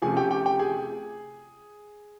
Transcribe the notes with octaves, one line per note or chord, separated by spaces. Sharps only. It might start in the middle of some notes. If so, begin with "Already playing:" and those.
C3 F3 A3 C#4 G#4 G#5
G4 G5
G4 G5
G4 G5
G#4 G#5